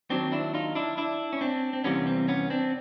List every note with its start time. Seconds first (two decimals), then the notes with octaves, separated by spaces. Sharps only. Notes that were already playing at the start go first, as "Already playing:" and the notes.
0.10 D#2 D#3 F#3 C4 D4
0.32 D4 E4
0.54 D#4 F4
0.75 D4 E4
0.97 D4 E4
1.33 C#4
1.41 C4 D4
1.73 C4
1.84 E2 C3 E3 G3 A#3 B3 C#4
2.07 C4
2.28 B3 C#4
2.50 C4 D4